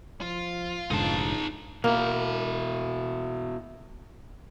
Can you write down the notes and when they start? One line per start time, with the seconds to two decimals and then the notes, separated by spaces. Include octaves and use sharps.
0.21 F3 F4
0.91 F1 C#2 G#2 D3 D#4 A5
1.84 B2 A#3 E4